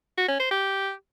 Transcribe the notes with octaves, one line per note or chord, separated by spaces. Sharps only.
F#4
C#4
C5
G4